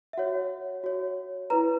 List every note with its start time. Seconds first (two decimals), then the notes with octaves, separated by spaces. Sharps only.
0.13 E5
0.18 F#4 C#5 F#5
0.84 F#4 C#5
1.50 E4 B4 A#5